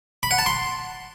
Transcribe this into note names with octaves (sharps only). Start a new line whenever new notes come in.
B5
F#5
A5
C6